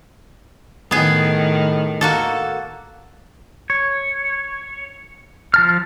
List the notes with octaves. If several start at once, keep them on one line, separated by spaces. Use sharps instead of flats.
A2 D#3 B3 G#4
A#3 F#4 A4
C#5
F3 A5 F6